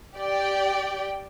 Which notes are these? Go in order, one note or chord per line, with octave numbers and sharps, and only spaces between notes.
G4 D5 G5